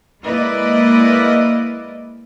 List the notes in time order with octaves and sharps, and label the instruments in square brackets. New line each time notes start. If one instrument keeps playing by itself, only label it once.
[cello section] G#3 A#3 E4 B4 D5 D#5